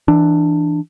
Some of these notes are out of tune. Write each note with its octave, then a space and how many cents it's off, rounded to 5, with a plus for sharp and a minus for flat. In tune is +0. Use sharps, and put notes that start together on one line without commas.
E3 +0 D4 +10